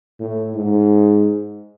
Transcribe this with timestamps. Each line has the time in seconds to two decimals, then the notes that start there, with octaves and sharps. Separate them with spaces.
0.20 A2
0.55 G#2